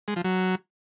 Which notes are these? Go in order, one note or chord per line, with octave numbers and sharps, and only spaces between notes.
G#3
F3
F#3